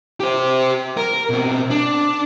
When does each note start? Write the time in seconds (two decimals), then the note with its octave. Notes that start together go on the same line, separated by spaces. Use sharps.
0.20 G4 C5
0.97 A#4
1.29 B2 C4
1.70 D4